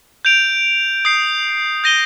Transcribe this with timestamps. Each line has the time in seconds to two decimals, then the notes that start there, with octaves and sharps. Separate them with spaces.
0.25 G6 D7 F7
1.05 D#6 G6 C7
1.84 G6 A#6 D#7 G7